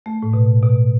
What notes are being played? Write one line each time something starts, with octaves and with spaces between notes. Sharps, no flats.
A3
A2
B2
B2